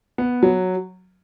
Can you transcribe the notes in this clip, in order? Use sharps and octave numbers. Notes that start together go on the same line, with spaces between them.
B3
F#3